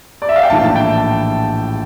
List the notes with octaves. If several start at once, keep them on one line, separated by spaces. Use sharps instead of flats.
D5
E5
F5
G5
A#1 A2 E3 A5
A5
G5